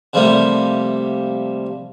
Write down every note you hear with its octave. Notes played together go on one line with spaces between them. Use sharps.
C3 F3 G3 A3 A#3